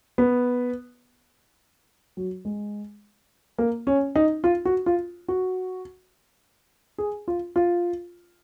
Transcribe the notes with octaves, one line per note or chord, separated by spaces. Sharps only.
B3
F#3
G#3
A#3
C#4
D#4
F4
F#4
F4
F#4
G#4
F4
F4